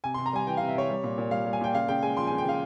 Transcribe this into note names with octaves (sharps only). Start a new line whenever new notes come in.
C3 G#5
C6
C3
A#5
G3 G#5
E3 G5
F5
C3
E5
C3 C#5
G3
A#2
A#2
G3 F5
G3
G#5
A#2 G5
C#3 F5
C#3 G5
G#3 G#5
F3 C6
G#5
C#3
G5
C#3 F5